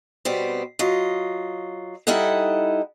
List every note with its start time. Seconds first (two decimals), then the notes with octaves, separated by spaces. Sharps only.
0.25 B2 G3 B3 C4
0.79 F#3 F4 D#5
2.07 G3 D#4 E4 A4 D#5 F#5